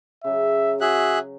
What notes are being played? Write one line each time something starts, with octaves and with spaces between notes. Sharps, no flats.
C#3 F#3 E5
F#4 G#4 E5 F#6